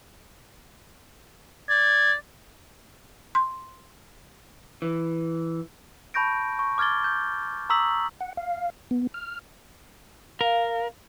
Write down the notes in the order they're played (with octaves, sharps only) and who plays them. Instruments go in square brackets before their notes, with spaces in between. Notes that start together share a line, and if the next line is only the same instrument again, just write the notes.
[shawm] D5 [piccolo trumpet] G#6
[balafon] C6
[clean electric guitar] E3
[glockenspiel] A5 B5 C#6 G6 A#6 D7
C#6
D6 F6 G#6 A6 G7
G6
A#5 C#6 D#6 E6 B6 F#7
[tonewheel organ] F#5
F5
B3
F6
[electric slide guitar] A#4 [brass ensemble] F5